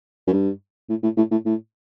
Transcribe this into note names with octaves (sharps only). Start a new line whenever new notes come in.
F#2
G2
A2
A2
A2
A2
A2